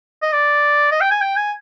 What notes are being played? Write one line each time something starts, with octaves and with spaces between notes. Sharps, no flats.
D#5
D5
D#5
G5
G#5
G5
G#5